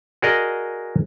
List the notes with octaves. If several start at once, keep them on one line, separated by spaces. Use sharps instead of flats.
F#4 G#4 A#4 D5 D#5